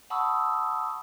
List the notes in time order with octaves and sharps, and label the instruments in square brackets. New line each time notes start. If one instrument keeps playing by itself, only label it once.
[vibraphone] F#5 A5 B5 C#6 D#6 E6